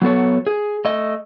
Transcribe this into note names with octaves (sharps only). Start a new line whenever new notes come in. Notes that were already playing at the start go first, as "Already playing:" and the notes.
F#3 B3 A4 C#5
G#4
A3 D#5